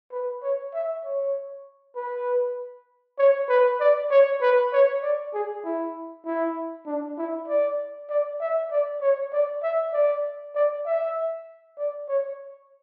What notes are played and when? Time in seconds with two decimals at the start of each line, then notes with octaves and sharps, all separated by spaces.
0.12 B4
0.42 C#5
0.74 E5
1.04 C#5
1.96 B4
3.18 C#5
3.49 B4
3.80 D5
4.10 C#5
4.41 B4
4.73 C#5
5.02 D5
5.34 G#4
5.65 E4
6.26 E4
6.87 D4
7.18 E4
7.48 D5
8.10 D5
8.40 E5
8.71 D5
9.01 C#5
9.32 D5
9.63 E5
9.93 D5
10.55 D5
10.86 E5
11.78 D5
12.08 C#5